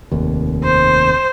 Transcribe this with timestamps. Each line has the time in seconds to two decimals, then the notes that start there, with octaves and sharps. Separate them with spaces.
0.12 F1 D#2
0.63 C5